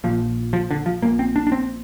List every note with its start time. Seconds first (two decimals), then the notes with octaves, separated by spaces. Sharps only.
0.04 A#1 A#2 F3
0.53 F3
0.71 D3
0.86 F3
1.02 A#1 A#2 A#3
1.19 C4
1.36 D4
1.47 D4
1.52 C4